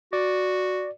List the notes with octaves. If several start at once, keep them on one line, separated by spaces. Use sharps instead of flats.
F#4 D5